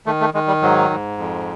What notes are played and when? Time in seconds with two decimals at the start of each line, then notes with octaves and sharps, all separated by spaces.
0.06 D#3 A3
0.21 A3
0.34 D#3 G#3
0.48 G3
0.62 G#2 F#3
0.90 G#2
1.18 F2